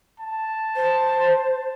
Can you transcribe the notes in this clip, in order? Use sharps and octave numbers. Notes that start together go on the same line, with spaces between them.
A5
C5